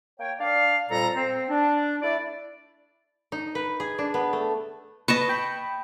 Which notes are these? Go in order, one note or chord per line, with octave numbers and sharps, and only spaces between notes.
A#3 C#5 G5
D4 D5 F5
F2 A#2 G3 A4 A#5
C4
D4
A3 E4 D5
D#4
B4
G#4
D4
B3
A3
B4 D#5 A5 C#6
G5 B5